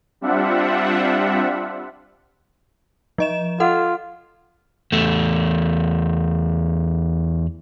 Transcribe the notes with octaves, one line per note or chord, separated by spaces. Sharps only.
G3 C4 D4 F4 E5 F#5
F3 D#5 E7
F4 A4 F#5
E2 A3